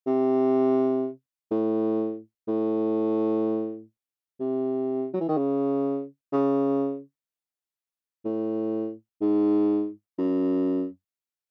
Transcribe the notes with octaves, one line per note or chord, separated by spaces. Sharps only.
C3
A2
A2
C3
F#3
E3
D#3
C#3
C#3
A2
G#2
F#2